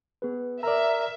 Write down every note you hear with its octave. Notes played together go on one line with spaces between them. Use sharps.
B3 G#4 B4
A#4 D5 E5 A#5 E6